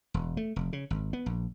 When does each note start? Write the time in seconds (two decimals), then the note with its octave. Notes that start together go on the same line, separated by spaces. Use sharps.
0.14 E1
0.37 A3
0.56 F1
0.73 C#3
0.90 G#1
1.13 B3
1.26 A#1